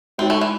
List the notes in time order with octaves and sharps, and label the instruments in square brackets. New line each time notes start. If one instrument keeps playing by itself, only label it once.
[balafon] G#3 D#4 F#4 C#5 [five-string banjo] C4
[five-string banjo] A3
E3